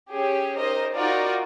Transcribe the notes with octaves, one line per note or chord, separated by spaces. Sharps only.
C#4 G4 G#4
D#4 A#4 C5 D#5
D#4 F4 F#4 A#4 D5